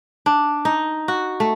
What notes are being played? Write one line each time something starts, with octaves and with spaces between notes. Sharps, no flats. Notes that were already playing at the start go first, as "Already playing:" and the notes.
D4
D#4
F#4
A3